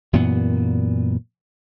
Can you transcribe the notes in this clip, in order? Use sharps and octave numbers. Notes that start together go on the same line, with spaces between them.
F#2 A#2 E3 B3